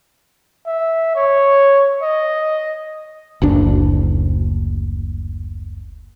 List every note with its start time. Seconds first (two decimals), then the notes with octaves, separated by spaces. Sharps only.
0.66 E5
1.15 C#5
2.02 D#5
3.42 F#1 D2 D4